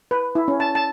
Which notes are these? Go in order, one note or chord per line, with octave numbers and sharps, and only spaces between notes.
B4
E4
C#4
A5
A5